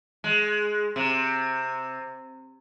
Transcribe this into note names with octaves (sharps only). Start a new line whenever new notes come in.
G#3
C3